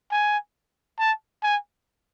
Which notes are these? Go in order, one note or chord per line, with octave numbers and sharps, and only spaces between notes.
G#5
A5
G#5